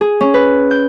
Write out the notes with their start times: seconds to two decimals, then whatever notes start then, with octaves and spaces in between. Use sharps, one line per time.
0.01 G#4
0.21 C#4
0.34 B4
0.71 G6